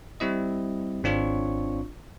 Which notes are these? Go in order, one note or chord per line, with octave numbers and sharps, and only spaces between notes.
G3 C4 E4 D#5
G#1 C4 D4 F4 C#5 C#6